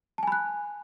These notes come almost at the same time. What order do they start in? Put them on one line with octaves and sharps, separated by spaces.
A5 G#5 B5 F#6